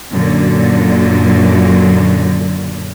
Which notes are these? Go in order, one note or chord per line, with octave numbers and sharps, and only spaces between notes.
F#2 A#2 D3 F#3